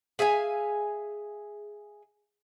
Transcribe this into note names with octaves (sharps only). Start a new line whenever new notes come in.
G#4 E5 F5 G#5